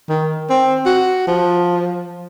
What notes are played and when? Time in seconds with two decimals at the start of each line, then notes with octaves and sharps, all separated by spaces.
0.09 D#3
0.50 C4
0.86 F#4
1.27 F3